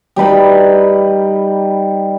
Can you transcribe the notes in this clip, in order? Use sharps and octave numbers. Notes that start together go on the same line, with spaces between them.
G3 D#4 B4 B5